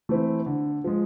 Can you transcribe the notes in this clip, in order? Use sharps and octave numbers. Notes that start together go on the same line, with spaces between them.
E3 A3 C4 E4
D3
F3 G#3